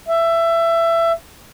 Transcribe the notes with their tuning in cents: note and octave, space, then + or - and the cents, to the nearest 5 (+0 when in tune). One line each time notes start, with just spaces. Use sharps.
E5 +20